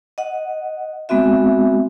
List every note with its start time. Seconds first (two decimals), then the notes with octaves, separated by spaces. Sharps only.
0.18 D#5 F#5
1.09 G#3 B3 C4 F#4 E5